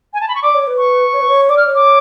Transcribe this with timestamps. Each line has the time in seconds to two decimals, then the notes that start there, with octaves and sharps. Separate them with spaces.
0.14 G#5
0.21 A5
0.28 B5
0.35 C#6
0.43 D5 D6
0.54 C#5
0.67 B4
0.78 C#6
1.13 C#5
1.21 B4
1.28 C#5
1.49 D5 D6
1.57 F6
1.67 C#5
1.75 D6